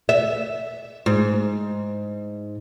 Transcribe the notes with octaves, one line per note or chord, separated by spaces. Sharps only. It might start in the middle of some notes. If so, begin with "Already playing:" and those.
E5
G#2